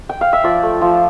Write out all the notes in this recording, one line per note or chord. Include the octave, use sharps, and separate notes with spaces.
G5
F5
E5
F3 D5
A3
F3